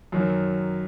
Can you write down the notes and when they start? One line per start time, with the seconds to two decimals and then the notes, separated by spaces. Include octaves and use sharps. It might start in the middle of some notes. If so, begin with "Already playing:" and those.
0.12 F#2 D#3 F#3